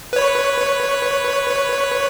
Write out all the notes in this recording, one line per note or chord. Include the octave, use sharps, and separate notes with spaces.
B4 C#5